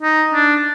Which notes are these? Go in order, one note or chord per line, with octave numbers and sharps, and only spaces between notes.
D#4
D4